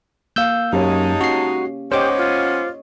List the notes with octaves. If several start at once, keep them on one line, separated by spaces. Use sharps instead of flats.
A#3 F5 E6 G6
F#2 G#3 D#4 G4 C#5 A5
C#4 F#4 C7
G#3 B3 C#4 G4 C5 C#5 D#5 D6
F4